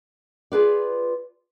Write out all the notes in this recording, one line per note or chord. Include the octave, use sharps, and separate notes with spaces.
F4 G#4 B4 D5